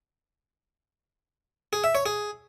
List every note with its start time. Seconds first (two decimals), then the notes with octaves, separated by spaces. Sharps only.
1.73 G#4
1.84 E5
1.95 C#5
2.06 G#4